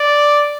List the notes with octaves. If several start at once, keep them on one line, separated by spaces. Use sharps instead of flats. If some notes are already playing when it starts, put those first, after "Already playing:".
Already playing: D5